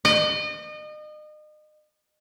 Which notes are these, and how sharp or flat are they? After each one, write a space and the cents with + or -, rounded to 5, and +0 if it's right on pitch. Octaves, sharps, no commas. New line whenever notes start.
D#5 -35